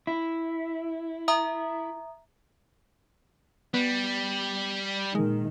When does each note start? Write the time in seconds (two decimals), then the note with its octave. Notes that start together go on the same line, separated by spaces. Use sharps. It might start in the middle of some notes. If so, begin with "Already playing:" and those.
0.07 E4
1.28 E5 A#5 D#6
3.74 G3 B3
5.15 A#2 D#3 G#3